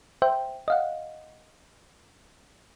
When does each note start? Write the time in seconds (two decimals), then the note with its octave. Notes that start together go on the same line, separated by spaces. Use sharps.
0.22 C5 E5 G5
0.68 D#5 F5 F#5